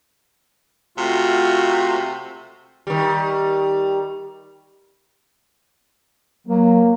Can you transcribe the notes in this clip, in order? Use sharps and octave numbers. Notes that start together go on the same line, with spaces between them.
C3 A3 F4 F#4
D#3 G3
F#3 A#3